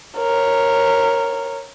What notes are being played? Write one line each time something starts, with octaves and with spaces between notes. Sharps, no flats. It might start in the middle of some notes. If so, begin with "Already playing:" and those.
A#4 C#5